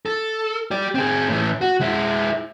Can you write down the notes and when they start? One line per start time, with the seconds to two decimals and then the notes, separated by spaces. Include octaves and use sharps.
0.06 A4
0.71 G4 D5
0.95 C4 G#4
1.29 A2 E3
1.61 F#4
1.81 G#3 E4